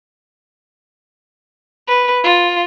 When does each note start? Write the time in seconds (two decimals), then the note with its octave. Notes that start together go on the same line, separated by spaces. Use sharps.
1.88 B4
2.24 F4